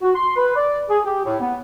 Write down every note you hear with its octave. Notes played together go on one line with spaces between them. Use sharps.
F#4
C6
B4
D5
G#4
G4
A2
B3